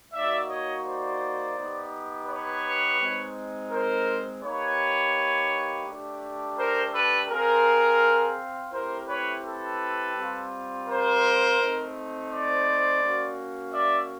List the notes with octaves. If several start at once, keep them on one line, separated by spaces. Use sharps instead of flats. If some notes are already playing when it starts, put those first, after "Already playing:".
A#3 D#4 F#4 D5 E5
C#5 D#5
C5 D5
B3 D#4 G4
B4 C#5
G#3 C4 D#4
A#4 C5
A#3 D#4 G4 B4 C#5
A3 D4 G4
A#4 C5
A4 B4
C4 F4 G#4 A#4
A3 C4 E4 G4 A#4 C5
B4 C#5
A4 B4
G3 C4 F4
A#4 C5
A3 C4 D#4
C5 D5
A#3 C#4 F#4
D5 E5